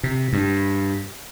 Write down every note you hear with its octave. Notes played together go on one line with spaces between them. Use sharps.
C3
G2